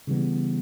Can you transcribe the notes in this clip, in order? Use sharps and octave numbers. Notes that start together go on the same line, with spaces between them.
C#3 E3 G3 B3